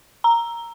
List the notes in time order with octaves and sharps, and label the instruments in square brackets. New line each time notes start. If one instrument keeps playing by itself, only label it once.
[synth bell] A#5